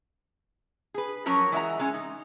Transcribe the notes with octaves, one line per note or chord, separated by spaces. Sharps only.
G#4 B4
F3 F#3 C#4 A#4 C#5
E3 G#3 E5 F#5 A#5
G#3 C#4
D#4